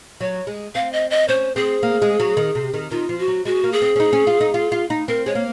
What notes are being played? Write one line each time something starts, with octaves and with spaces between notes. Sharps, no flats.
F#3 C#5
G#3
C4 F5
D#5
D#5
C#4 C5
C4 G#4
A#3
G#3
F#3
D#3
C3
D#3
D#3 F4
F3
F#4
F#3
G#3 F#4
A#3
G#4
C4
C#4
D#4
C#4
F4
D#4
F4
F4
D#4
C4 A#4
G#3 C#5
A#3